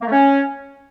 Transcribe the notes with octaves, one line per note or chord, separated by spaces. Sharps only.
A#3
A3
C#4